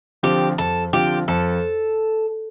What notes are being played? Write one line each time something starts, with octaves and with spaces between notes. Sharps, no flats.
D3 F3 C4 F4 G4
F2 A4
D3 F3 C4 F4 G4
F2 A4